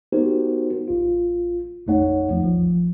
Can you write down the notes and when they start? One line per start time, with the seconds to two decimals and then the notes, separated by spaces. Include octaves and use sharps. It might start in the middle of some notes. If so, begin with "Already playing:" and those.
0.12 B3 D#4 F#4 G4 A#4 C5
0.88 A1 F4
1.87 A1 F2 A3 D#4 C#5 F#5
2.29 E2 F3
2.42 A#1 F3